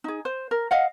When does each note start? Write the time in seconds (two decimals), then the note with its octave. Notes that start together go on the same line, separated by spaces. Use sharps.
0.04 D#4 G#4
0.25 C5
0.51 A#4
0.71 D#5 F5 F#5